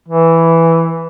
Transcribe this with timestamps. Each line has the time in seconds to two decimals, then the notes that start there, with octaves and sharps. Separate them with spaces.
0.08 E3